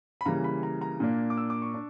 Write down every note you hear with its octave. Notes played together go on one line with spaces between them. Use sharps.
B5
C#3 E3 G3 A#3 A#5
B5
A#5
A#5
A#2 A#3 D4
D6
E6
D6
C#6
D4